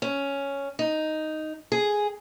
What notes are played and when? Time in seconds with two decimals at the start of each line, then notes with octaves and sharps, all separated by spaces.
0.02 C#4
0.79 D#4
1.72 G#4